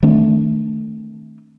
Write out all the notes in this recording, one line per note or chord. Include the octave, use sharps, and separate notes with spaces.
D#3 A3 C4 D4